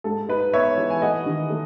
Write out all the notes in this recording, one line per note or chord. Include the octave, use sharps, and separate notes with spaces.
G#2 A4
D#4 B4
B3 C#5 E5
E3
G#5
A3 D#5 F#5
D#3
A3